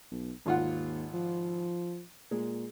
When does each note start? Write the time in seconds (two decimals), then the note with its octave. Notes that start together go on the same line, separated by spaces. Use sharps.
0.11 B1
0.46 G#1 D#2 F4 F#5
1.14 F3
2.31 A#2 G#3